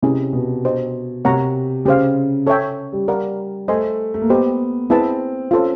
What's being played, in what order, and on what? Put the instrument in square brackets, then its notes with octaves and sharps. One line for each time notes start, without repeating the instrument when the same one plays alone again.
[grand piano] C3 [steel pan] C#4 E4 G#4
[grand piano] B2
[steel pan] D4 G4 C5 D#5
[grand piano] C3 [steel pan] A#4 C#5 F#5 A#5
[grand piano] C#3 [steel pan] G4 C5 F5
[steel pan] A4 C#5 E5 G5
[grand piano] G3
[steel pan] A#4 D5 F#5 B5
[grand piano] A3 [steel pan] C5 D#5 G#5 C6
[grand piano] A3
A#3
[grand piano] B3 [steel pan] G4 C5 D#5
[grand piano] C4 [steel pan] E4 G#4 B4 E5 A5
[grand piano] C#4 [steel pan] F4 A4 C5